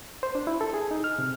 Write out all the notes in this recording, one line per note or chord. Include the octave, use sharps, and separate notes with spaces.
C5
D4
E4
A4
G#4
D#4
F6
C3